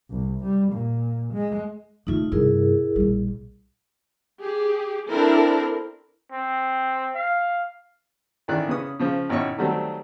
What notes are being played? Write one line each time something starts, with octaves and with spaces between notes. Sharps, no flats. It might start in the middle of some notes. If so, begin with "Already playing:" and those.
C2
G3
A#2
G#3
C#3 A3 D#4 F4
G2 C3 E4 G#4 A#4
A#1 G3
G4 G#4
C4 D4 E4 A4 A#4
C4
F5
A1 D#3 E3 D5 F#6
C#3 C#4 B4 D#6
C#3 F3 C5
G#1 B2 C#4 E4 C#5 C#6
D#3 F#3 G3 A3 C4